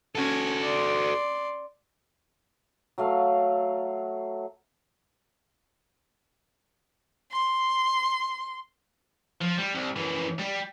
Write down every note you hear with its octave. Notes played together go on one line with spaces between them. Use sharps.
C#4 F#4 A4 G#5
D5 C6
F#3 A3 F5
C6
F3
G3
C2
F#2 E3
G3